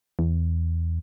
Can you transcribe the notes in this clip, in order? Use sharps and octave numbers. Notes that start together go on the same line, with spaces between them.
E2